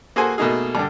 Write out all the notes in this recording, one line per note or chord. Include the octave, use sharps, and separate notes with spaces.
A#3 F#4 G#4 A4 C5 G#5
B2 A3 A#3 D#4 G#4
G2 D3